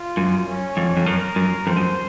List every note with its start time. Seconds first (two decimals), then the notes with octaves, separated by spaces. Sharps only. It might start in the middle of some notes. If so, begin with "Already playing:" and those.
Already playing: F4
0.17 F#2
0.47 C#4
0.77 F2
0.97 F2
1.06 F#2 A#4
1.36 F#2
1.67 F2 C5
1.77 F#2